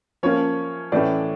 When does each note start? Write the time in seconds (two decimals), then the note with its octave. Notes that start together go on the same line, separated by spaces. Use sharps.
0.23 F3 A#3 C#4 C#5
0.92 A2 E3 A3 C#4 D5